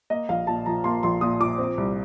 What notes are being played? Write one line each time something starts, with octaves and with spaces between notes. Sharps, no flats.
A#3 D#5
A#1 F5
A#2 A5
F3 A#5
A#3 C6
A#1 C6
A#2 D#6
F3 D6
C4
C2